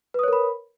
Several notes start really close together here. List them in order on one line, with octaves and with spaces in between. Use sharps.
B4 D#6 C#5 A#4 B5